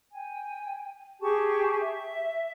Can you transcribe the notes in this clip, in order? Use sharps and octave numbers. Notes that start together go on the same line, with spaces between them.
G5 G#5
G4 G#4 A5 C#6
E5